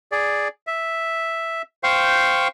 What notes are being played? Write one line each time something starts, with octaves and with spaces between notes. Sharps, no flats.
G#4 D5
E5
C5 F5 G5 C#6